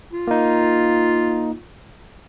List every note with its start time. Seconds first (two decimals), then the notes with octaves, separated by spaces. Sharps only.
0.12 F4
0.27 A#3 D#4